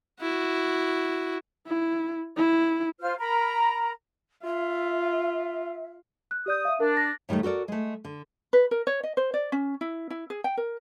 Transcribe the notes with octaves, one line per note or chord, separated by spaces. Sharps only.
E4 F#4
E4
E4
F4 C5 F6
A#4 A#5 B5
F4 E5
F#6
G4 D5 D#6 G6
E5 F5
D4 A#4
A#6
A2 D#3 F#3 G3 A3
F#4 A4 A#4 D5
G#3 A3
D3
B4
A#4
C#5
D#5
C5
D5
C#4
E4
E4
G#4
G5
A#4